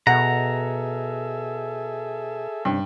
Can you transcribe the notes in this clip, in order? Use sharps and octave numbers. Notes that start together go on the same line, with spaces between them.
B2 G#4 A4 E5 F#5 A#5
G2 C3 C#4